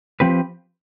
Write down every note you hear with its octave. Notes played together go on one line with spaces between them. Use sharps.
F3 C4 G4 B4